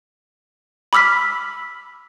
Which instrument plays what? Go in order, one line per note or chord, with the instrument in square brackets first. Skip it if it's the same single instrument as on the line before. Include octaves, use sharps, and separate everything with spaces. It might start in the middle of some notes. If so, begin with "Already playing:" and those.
[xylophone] B5 D6 E6 F6 B6